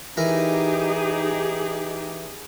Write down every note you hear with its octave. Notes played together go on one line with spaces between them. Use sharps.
E3 D#4 G4 G#4 A#4